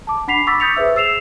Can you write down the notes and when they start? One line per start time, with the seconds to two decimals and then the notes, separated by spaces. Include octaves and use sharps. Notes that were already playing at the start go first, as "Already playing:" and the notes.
0.07 A5 D6
0.27 D4 F#5 B5 B6 C7 F7
0.46 B5 C#6 D6 E6 A6 B6
0.60 D#6 G6 A6 B6 C#7 F7
0.76 G#4 B4 C5 E5 E6
0.95 G#4 E6 C7 E7 F7